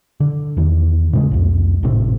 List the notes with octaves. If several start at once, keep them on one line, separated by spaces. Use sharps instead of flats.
D3
E2 D#3
A#2 C#3 G#3
C2 F2
G#1 A2 C3 C4